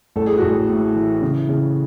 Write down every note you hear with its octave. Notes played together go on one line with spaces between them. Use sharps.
A1 A4
G#4
A1 F#4
G#4
A2
E3
C#3
C#3